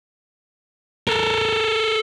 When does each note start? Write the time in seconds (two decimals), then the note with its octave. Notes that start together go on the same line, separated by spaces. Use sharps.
1.08 A4 A#4